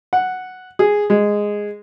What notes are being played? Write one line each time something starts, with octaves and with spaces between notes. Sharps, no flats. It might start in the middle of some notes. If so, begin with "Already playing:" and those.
F#5
G#4
G#3